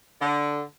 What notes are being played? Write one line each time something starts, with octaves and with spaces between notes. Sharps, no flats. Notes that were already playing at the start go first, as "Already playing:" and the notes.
D3